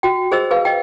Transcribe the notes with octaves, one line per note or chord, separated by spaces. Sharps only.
F#4 G5
G#4 C5 D#5 E6
G#4 B4 F5
D#5 G5